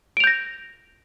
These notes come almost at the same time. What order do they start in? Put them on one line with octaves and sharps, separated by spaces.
D7 F7 G6 A#6